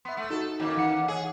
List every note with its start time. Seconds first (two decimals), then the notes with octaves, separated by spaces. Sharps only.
0.05 B3 E5 C6
0.17 A3
0.30 D#4 F#4 A4
0.60 D#3 A#3 C#4
0.77 E3 F#5 C#7
1.08 G#4 C#5 G#5